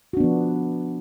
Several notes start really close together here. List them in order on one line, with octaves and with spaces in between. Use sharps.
F#4 D4 B3 F3